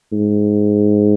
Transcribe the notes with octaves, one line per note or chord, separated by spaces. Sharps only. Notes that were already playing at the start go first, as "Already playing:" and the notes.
G#2